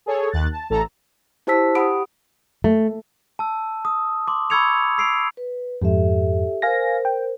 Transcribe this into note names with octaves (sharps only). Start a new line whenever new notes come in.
G#4 A4 C#5
D#2 F#6 A6
A5
A1 A4 A5 A#5
E4 G4 C5 A5 E6 B6
G4 F#5 B5 D#6 D7
A3
A5 E6
D#6
C6 D6
B5 C#6 E6 G#6 C#7 F7
E6 C7 D7 F7
B4
F2 G#2 G4 A4 E5
A#4 C5 F5 G#5 A#6
G5